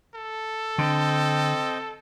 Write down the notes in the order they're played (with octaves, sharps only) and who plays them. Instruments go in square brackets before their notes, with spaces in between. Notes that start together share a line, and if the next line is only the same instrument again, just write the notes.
[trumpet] A4
[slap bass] D3 [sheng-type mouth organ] C4 D#5 G5